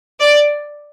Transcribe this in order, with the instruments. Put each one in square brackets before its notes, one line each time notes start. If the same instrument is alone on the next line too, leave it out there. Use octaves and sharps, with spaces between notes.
[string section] D5